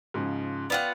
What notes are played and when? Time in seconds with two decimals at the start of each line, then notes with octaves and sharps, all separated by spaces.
0.14 G#2 C#3 F3
0.70 B3 F4 D5 F#5 G5